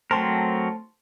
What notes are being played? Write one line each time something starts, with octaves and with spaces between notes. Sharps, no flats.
F#3 A3 C4 A#4 C5 A5 C6